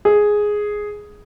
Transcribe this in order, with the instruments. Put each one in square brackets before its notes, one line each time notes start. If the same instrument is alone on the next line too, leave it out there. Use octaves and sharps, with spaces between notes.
[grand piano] G#4